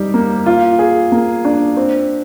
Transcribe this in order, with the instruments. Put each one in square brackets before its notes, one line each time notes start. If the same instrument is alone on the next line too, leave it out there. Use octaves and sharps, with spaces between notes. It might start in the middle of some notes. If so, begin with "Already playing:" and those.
Already playing: [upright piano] G3 D#4 G4
A#3
F4
G#4
A#3
D4
C4